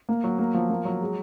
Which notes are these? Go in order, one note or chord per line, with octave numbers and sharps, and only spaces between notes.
A#3
F#3
A#3
F3
A#3
F#3
G#3